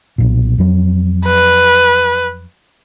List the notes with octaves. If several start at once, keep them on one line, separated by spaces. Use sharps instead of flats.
B1 A#2
F2 F#3
B4